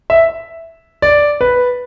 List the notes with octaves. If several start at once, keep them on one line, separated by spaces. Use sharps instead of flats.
E5
D5
B4